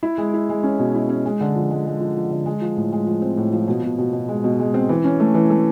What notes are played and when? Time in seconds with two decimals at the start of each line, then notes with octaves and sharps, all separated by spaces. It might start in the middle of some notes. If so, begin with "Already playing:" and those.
0.03 E4
0.18 G#3
0.34 E4
0.49 G#3
0.63 C#4
0.79 B2
0.95 E4
1.09 C#4
1.25 G#3
1.41 D3
1.55 F3
1.70 G#3
1.86 G#3
2.00 F3
2.16 F3
2.31 D3
2.46 G#3
2.61 F3
2.76 A2
2.93 G#3
3.07 F3
3.22 C4
3.37 A2
3.53 F3
3.68 B2
3.83 B2
3.98 B2
4.13 B2
4.28 G#3
4.44 B2
4.60 G#3
4.74 C4
4.89 E3
5.04 C#4
5.20 A3
5.34 E3
5.50 A3